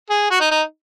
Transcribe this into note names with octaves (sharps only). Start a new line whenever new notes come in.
G#4
F#4
D#4
D#4